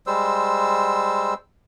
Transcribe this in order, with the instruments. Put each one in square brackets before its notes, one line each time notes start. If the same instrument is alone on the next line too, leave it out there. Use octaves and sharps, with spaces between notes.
[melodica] G3 G#3 C5 E6